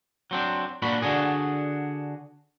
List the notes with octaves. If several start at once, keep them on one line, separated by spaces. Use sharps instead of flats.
F#3 C4 D4
A#2 D4 F#4 B5
D3 D4 F#4 G#4